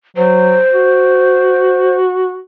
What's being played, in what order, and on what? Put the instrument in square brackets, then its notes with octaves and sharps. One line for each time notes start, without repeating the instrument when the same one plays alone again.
[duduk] F#3 [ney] C5
[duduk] F#4